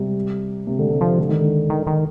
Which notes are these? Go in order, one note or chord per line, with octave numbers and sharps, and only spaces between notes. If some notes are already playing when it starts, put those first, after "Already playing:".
Already playing: C3 G3
C3 A#3
D3 A3
C3
F3
D3
D#3
D3
D#3
D#3